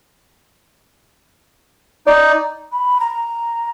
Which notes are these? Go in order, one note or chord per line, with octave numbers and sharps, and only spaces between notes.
D#4 D5
B5
A#5